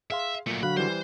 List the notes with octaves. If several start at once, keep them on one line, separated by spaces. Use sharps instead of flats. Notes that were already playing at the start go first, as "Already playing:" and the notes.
G#4 E5 F5 C6
A#2 F#3 A3
D3 F#3 F#4 F5 B5 F#6
E3 G3 C5